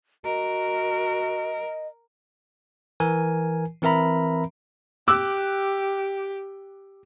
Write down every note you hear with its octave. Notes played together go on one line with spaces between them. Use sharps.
F#4 A#4 D#5
E3 A#4 G#5
E3 C4 A#4 E5 A#5 B5
G4 D6 E6 F#6